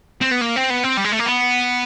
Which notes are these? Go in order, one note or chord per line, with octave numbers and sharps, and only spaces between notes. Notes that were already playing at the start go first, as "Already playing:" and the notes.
C4
B3
A#3
C4
B3
C4
G3
G#3
A3
A#3
B3